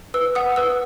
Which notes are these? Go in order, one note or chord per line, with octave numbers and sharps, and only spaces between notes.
B4 E6
F#5 D#6
B4 E6